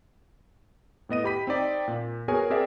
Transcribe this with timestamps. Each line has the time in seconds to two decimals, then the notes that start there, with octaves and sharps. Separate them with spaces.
1.09 A2 B3 D#5 D#7
1.24 G4 B5 B6
1.47 C4 D#4 D5 G5
1.88 A#2
2.28 B3 F#4 G#4 A#4 C#5 G#5
2.50 C4 G#4 A#4 D5 E5 F#5